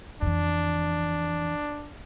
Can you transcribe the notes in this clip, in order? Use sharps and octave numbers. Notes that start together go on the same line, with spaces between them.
F2 E3 D4